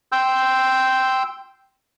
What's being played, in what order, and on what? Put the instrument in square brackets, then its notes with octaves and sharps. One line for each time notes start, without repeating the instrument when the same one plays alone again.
[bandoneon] G5 C6 E6 G6